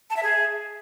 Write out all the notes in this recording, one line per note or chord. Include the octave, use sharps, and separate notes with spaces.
A5
E5
G#4